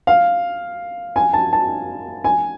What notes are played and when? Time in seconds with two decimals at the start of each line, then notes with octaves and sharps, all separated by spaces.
0.07 F5
1.16 G#5
1.33 A5
1.53 A5
2.24 G#5